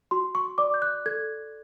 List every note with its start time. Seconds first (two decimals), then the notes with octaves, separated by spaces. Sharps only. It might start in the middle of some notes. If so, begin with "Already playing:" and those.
0.11 F#4 C6
0.35 C#6
0.58 D5 D6
0.74 G6
0.82 F#6
1.06 A4 G#6